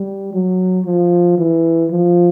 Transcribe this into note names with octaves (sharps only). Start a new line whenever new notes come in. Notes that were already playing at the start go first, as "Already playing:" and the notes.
Already playing: G3
F#3
F3
E3
F3